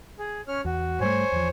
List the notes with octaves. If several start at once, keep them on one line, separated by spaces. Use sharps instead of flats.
G#4
C#4 C#5 F6
E2 F#4
G#2 G3 A3 C5 C#5 G#5
E2 F3